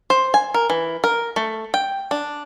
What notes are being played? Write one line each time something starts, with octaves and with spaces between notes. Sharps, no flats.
C5
G#5
A#4
E3
A#4
A3
G5
D4